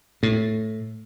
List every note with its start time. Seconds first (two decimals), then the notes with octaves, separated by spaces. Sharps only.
0.23 A2